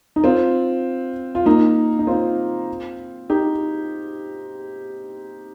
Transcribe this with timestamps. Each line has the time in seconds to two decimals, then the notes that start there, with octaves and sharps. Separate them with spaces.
0.16 D#4
0.24 C4 F4
1.35 F4
1.46 A#3 D#4
1.99 D#4
2.07 C4 F4
3.30 D#4 G4